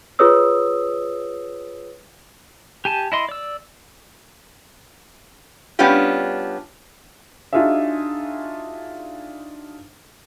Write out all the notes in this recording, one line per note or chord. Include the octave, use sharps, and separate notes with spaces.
F4 G#4 B4 C#5 D#6 E6
G4 G#5 A5
E4 D#5 C6
D5 E6
G3 B3 C#4 D4 F4 G4
D4 D#4 F4 F#4 G#4 E5